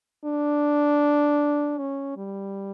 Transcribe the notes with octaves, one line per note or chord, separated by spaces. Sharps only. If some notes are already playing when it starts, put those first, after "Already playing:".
D4
C#4
G3